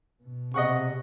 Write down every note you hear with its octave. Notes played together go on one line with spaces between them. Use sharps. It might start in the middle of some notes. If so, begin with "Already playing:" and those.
B2
C3 D#5 F#5 C#6